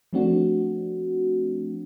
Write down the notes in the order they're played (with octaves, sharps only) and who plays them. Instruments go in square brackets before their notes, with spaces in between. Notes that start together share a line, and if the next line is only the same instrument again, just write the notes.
[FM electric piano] F3 A3 C4 D4 F#4